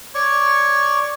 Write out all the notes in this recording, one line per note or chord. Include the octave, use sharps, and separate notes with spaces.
C#5 D5 C#6